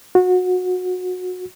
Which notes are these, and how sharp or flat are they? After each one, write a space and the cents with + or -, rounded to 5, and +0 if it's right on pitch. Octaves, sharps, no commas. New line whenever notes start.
F#4 -25